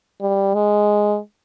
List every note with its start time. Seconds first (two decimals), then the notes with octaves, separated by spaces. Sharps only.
0.21 G3
0.54 G#3